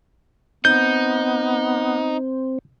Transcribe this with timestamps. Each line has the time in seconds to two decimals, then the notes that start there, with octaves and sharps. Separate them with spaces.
0.65 B3 C4 D#4 G6